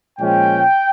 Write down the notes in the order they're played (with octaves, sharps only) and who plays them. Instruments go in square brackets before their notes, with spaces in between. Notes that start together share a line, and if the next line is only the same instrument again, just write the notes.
[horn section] A#2 F3 G#3 C#4 G5